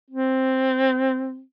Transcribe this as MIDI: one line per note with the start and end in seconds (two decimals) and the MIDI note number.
0.10 1.42 60